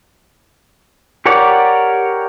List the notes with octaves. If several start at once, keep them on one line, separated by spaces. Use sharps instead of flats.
G4 A#4 C#5 D5 F#5